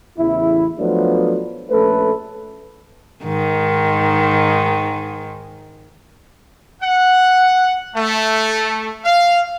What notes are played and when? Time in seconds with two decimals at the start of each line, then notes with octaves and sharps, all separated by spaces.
0.17 A1 E2 C#3 E4
0.77 F3 F#3 A3 B3 D4 F4
1.71 A#1 A3 C#4 A4 B4
3.24 G#2 D#3
6.83 F#5
7.96 A3
9.05 F5